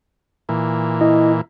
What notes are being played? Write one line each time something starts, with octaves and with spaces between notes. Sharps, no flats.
A#2 E3
E4 D#5